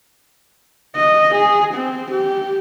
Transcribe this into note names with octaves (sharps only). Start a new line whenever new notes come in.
D#5
G#4
C4
G4